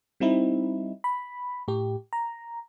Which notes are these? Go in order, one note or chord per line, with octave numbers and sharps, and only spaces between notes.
G3 C4 D#4 E4
B5
A2 G4
A#5